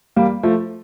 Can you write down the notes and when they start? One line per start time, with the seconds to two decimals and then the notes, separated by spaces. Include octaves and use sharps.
0.16 G3 A#3
0.43 F3 A3